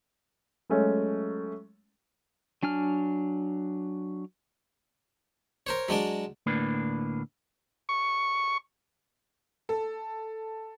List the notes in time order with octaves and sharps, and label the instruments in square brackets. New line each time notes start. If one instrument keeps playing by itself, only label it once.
[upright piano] F#3 G#3 A3 C#4
[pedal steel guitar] F#3 D4 G#5 F6
[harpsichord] A#4 C5 C#5
F#3 G#3 D4 D5
[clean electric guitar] D2 A2 A#3 D4 B4
[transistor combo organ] C#6
[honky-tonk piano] A4